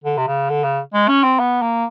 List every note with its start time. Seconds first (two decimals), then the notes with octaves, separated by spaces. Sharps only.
0.04 D3
0.18 C3
0.27 C#3
0.50 D3
0.64 C#3
0.94 G#3
1.08 C#4
1.24 C4
1.39 B3
1.62 A#3